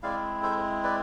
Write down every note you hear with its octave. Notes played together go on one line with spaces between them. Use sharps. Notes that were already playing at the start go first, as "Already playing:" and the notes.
G#3 C4 E4 D5 F5
A4 C5
B4 D5